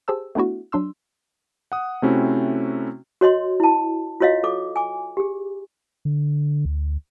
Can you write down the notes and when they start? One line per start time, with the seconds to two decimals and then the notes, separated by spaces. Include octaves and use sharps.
0.08 G4 G#4 C5 A5 E6
0.35 A3 B3 D4 E4 F#4
0.72 F#3 D4 C6 E6
1.72 F#5 D#6
2.02 C3 A3 C4 C#4 E4 F#4
3.21 F#4 C#5 D#5 C6
3.60 E4 A5
4.20 F4 F#4 C#5 D#5 F5
4.44 A4 D6
4.76 G#5 D6
5.17 G4 G#4
6.05 D3
6.65 D2